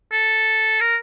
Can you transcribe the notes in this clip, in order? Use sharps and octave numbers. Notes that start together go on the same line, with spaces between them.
A4
A#4